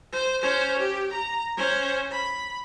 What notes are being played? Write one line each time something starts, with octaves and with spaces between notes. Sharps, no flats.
C5
C#4 C5
G4
A#5
C#4 C5
B5